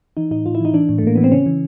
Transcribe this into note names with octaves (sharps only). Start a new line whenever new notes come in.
E3 D#4
A2 D#4
A2 F4
E4
E3
D#4
E3 D4
A2
A3
A2 A#3
E3 B3
C4
C#3 C#4
E3